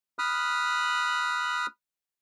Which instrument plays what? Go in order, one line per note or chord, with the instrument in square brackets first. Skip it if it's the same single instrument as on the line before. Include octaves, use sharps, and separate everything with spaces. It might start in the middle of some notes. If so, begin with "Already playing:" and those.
[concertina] B5 D#6 F6 F#6